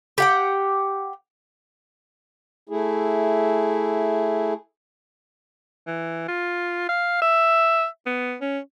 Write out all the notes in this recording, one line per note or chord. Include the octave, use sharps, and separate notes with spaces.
G4 F#5 G5
A3 E4 G#4
E3
F4
F5
E5
B3
C#4